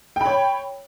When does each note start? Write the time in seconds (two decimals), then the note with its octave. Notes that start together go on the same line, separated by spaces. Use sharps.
0.16 G5
0.21 B5
0.26 C#5